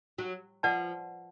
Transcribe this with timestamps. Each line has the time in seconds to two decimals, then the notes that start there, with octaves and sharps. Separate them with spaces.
0.18 F#3
0.63 F3 B4 D5 F#5 A5